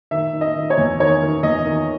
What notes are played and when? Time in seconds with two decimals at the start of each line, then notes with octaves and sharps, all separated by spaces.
0.11 D#3 E5
0.33 D#3
0.41 D#5
0.56 D#3
0.70 C#5
0.78 E2
1.00 D#3 C#5
1.22 D#3
1.43 E2 D#5
1.65 D#3